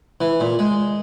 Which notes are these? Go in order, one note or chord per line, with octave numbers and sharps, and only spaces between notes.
E3
A#2
G#3